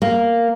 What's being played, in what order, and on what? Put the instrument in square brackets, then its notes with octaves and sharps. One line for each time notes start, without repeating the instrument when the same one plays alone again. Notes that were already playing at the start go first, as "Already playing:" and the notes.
[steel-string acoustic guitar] A#3